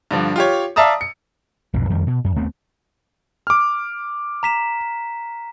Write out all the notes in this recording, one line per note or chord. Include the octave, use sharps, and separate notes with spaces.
G2 D3 F3
F4 G4 C#5
D5 E5 F5 A5 A#5 D#6
C#7
B1 F2 G#2 B2
F2 D#3 G3
B2
F#2
D#2 A3 B3 C4
D6 F6
A#5 B6 E7